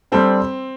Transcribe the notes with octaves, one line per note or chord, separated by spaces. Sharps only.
G3 C4 D4 A4 C5